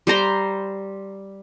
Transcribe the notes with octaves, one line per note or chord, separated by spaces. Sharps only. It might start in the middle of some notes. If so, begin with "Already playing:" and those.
G3 C5 A#5 C6